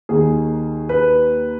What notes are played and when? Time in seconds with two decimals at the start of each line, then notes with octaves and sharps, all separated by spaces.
0.09 D#2 D#3 G#4
0.89 B4